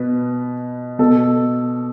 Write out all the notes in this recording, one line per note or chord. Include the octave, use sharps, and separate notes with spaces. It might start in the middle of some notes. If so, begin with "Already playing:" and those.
Already playing: B2 B4
B2 A4